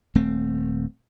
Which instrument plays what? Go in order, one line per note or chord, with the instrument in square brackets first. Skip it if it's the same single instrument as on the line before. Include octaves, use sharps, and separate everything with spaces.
[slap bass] D#1 A3 C4